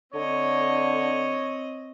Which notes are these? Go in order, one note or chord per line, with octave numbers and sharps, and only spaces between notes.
D3 C4 C#5 D#5